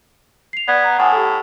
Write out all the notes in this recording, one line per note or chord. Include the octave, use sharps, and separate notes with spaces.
C7 F7
B3 D5 G#6
A#5
A2 F#5 G#5 D#6
G4 A4